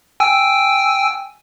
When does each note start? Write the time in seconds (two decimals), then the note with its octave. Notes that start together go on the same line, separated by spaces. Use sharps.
0.20 G5 G#5 E6